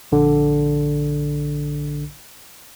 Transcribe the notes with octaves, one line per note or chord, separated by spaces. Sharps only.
A#1 D3